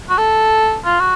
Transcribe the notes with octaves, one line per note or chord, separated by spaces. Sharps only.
F#4
A4
F4
F#4